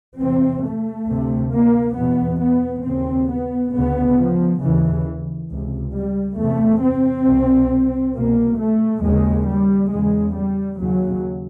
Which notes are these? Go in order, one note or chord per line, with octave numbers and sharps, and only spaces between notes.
E2 C3 C4
A3
D2 C3
A#3
E2 B2 B3
B3
D#2 C#3 C4
B3
D2 C#3 B3
F3
D#2 C#3 E3
C#2 C3
G3
E2 C3 A3
C4
C2 B2
C2 B2 A#3
A3
D#2 C#3 G#3
G3
E2 C#3 G#3
G3
D#2 C#3 F#3